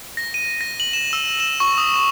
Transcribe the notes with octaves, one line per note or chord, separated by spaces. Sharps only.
A#6
D#7
A#6
F#7
E7
E6
E7
C#6
D#6
E7